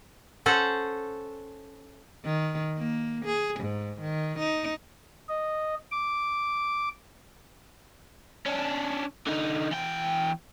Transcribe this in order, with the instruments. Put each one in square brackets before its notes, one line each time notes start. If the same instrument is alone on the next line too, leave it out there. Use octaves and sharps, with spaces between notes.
[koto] C#4 A4 C5 F#5
[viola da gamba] D#3
A#3
G#4
G#2
D#3
D#4
[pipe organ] D#5
D6
[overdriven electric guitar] C#4 D4
D3 D#4
E2 G5